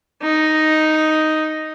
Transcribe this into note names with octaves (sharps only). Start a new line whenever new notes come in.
D#4